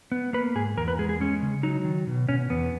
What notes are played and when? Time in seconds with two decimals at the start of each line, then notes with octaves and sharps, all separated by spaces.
0.12 B3
0.33 A#3 B4
0.55 G#2 G#4
0.77 E2 A#4
0.88 B4
0.99 G#3 G#4
1.09 G#4
1.20 G#3 C#4
1.42 C#3
1.63 F#3 D#4
1.85 D#3
2.07 B2
2.29 B2 C#4
2.50 E2 B3